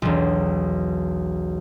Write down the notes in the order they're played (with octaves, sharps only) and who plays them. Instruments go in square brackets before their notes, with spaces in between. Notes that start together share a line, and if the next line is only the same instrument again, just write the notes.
[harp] E1 B1